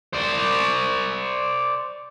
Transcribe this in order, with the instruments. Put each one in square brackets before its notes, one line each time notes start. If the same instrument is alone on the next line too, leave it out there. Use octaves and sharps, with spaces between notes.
[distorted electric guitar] C5 D5